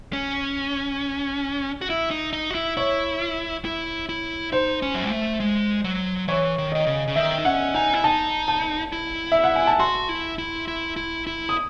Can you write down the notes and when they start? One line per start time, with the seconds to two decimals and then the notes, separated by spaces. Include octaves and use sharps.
0.13 C#4
1.81 F#4
1.90 E4
2.11 D#4
2.33 D#4
2.51 F#4
2.55 E4
2.77 E4 C#5
3.65 E4
4.09 E4
4.52 D#4 C5
4.82 C#4
4.95 F#3
5.03 G#3
5.11 A3
5.40 G#3
5.84 F#3
6.28 E3 C#5
6.58 D#3
6.72 D#3 D#5
6.86 C#3
7.08 C#3
7.16 D#3 E5
7.38 D#4
7.45 C#4 F#5
7.74 D#4 G#5
7.94 E4
8.04 D#4 A5
8.48 A5
8.92 E4
9.32 E5
9.44 F#5
9.55 G#5
9.67 A5
9.79 F#4 C6
10.09 E4
10.38 E4
10.68 E4
10.96 E4
11.27 E4
11.49 D#6